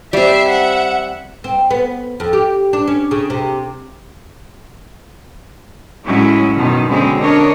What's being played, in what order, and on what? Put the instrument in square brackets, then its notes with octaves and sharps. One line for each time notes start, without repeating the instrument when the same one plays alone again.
[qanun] G3 C4 [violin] E5 C7
[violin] E5 F#5
[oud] C4
B3
F2
G4
D4
C#4
C#3
C3
[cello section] A2 F#3 G#3 C#4 E4
F#2 B2 D#3 D#4
B2 D3 F#3 G#3 C4 C#4
D4 A#4 C#5 D#5